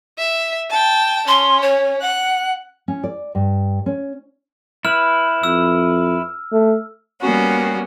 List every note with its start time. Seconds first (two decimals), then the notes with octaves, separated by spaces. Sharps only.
0.18 E5
0.70 G5 A5
1.28 C#4 C6
1.62 C#5
2.02 F#5 F#6
2.88 C#4
3.04 D5
3.35 G2
3.86 C#4
4.85 E4 B4 F6
5.43 F2 E6
6.52 A3
7.20 G3 A#3 B3 C#4 F#4